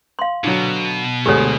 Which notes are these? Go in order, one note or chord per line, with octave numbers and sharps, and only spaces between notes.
F5 C6
B2 D3 F#3
D2 G#3 G4 A4 C#5